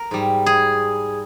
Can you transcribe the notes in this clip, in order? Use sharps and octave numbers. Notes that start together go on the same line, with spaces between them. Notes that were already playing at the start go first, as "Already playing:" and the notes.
Already playing: A#4
G#2 G3
G#4